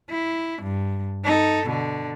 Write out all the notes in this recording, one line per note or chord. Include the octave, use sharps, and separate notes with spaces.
E4
G2
D#4 A4
B2 D3